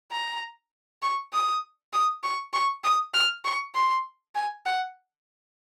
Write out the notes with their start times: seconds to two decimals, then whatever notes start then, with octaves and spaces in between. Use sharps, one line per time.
0.11 A#5
1.02 C#6
1.33 D#6
1.93 D#6
2.23 C#6
2.53 C#6
2.84 D#6
3.14 F6
3.44 C#6
3.74 C6
4.35 G#5
4.66 F#5